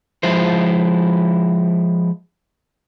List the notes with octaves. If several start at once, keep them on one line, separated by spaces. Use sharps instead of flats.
F3 G#3 E4 C5